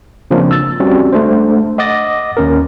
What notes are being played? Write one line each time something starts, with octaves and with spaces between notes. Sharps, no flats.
C#3 F3 A#3 C4 D4
E6 A6
G3 C4 C#4 F#4
G#3 A3 D4 C5
D#5 F#5 D6 D#6 A6 A#6
D#2 C#4 A#4